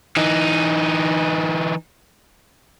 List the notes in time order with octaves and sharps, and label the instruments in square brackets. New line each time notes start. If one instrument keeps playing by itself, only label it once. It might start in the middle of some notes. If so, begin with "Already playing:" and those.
[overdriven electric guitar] E3 D#4